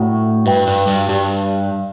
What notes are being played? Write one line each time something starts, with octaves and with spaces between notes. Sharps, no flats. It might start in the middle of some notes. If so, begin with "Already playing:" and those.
Already playing: A2 A3 D4 F#4 F#5
G2 F#4 B4 E5 G5
G2
G2
G2 G4 D5 A5